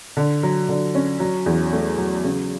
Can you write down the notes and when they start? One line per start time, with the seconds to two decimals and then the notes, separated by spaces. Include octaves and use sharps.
0.17 D3
0.43 F#3
0.69 D3
0.95 C#4
1.20 F#3
1.46 E2
1.72 A3
1.98 F#3
2.24 C#3